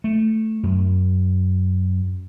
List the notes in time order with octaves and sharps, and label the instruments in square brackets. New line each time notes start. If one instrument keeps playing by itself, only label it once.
[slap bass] A3
F#2